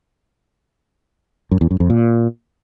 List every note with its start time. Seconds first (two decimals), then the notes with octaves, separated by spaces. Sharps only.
1.51 F#2
1.61 E2
1.71 F#2
1.80 F2
1.90 A#2